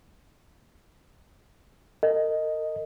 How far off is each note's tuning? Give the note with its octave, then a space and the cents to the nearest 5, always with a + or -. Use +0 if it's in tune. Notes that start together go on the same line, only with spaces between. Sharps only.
A#4 -40 D#5 +0